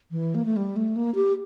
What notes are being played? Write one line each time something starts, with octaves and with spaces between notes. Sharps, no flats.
E3
A#3
A3
G3
A3
A#3
G4